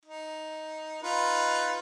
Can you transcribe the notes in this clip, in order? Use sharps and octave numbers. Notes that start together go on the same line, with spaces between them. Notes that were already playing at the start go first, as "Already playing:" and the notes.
D#4
D#4 F4 B4